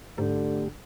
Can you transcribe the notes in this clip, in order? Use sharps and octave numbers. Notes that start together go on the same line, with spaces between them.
G#2 D3 A3 G4